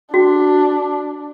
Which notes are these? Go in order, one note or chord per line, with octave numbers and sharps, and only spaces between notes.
D4 F#4